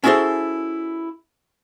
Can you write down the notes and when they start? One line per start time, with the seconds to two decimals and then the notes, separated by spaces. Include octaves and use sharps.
0.04 C#4 E4 F#4 G#4 A4 C5